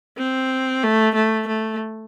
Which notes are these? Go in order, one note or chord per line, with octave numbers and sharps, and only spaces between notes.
C4
A3
A3
A3